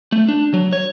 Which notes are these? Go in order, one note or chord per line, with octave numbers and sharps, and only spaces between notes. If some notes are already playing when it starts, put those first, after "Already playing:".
A3
D4
F#3
C#5